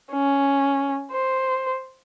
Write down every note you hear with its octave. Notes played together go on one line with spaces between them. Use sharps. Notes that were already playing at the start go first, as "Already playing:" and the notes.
C#4
C5